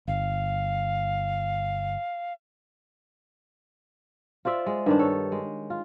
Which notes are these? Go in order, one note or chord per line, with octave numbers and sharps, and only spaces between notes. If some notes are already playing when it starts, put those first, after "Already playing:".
G1 F5
F4 C5 D5 E5
G#3
G2 D#3 D4
A4 C#5
G#3
F4